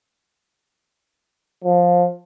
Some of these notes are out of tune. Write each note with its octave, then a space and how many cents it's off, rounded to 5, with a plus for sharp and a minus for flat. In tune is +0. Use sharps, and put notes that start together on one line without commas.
F3 +15